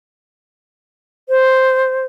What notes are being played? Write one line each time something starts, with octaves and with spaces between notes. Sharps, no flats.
C5